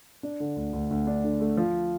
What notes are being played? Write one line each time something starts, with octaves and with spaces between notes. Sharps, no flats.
D4
D3
D2
D2
D2
D4
D3
A3
F3